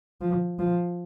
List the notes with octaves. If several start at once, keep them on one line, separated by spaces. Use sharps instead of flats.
F3
F3